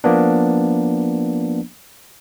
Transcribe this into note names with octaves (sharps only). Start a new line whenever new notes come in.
F3 A#3 B3 D4